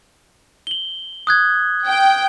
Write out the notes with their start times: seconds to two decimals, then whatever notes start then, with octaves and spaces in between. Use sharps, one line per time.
0.67 F#7 G7
1.27 D#6 F#6 G#6
1.86 G5